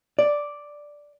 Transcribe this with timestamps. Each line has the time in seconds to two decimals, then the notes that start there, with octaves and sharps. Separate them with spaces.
0.19 D5